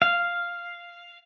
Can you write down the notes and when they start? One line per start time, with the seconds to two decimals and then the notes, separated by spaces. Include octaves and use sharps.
0.02 F5